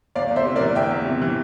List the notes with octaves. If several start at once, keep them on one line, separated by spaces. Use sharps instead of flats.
E2 D5 F5
E2
C5 E5
C3
A#4 D5
E3
E2 E5 G5
E2
C3
E3